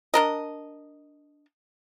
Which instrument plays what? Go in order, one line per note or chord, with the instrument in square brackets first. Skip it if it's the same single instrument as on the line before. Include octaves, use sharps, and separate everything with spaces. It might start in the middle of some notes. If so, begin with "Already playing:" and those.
[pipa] D4 A#4 D#5